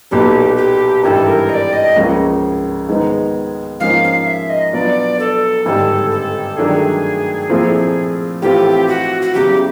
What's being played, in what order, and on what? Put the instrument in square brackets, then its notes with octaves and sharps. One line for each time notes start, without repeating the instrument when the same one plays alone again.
[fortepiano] B1 A#2 F#3 [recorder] G4
[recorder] G4
[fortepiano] G#1 G2 E3 G3 [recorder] A4 A#4
[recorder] A#4
D#5
D5
D#5
[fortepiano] C#2 C#3 F3 A#3
G#2 D#3 G#3 B3 D#4
[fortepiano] G#2 F3 A#3 C#4 F4 [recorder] F5
[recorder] F5
E5
D#5
[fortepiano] B2 F#3 B3 D4 F4 [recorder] D5
[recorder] A4
[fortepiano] G#1 G2 D3 G3 [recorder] A4
[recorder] A4
[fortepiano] G2 D#3 F#3 A3 D4 [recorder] G#4
[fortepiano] A#2 F3 A3 C4 E4
[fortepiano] A2 E3 A3 C4 F4 [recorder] G4
[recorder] F#4
F#4
[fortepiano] E2 C#3 F#3 [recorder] G4